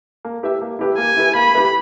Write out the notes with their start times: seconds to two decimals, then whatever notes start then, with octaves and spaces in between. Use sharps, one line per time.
0.25 A#3
0.43 E4 G4 B4 E5
0.62 A#3
0.79 E4 G4 B4 E5
0.98 A#3 G#5
1.17 E4 G4 B4 E5
1.35 A#3 B5
1.54 E4 G4 B4 E5